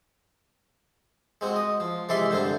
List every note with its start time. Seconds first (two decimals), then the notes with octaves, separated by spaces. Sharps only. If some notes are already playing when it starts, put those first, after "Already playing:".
1.41 G#3 C4 F#4
1.56 D#5
1.80 F3
2.09 C3 E3 G#3 D5 E5 C6
2.30 G2 D3 C4 D4 C5